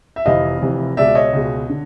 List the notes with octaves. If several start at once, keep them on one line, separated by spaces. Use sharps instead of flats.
E5
F1 F2 C3 E3 D#5 F5
F1 F2 C3 E3
C#2 B2 G#3 D5 E5
C#5 D#5
C#2 B2 G#3
D3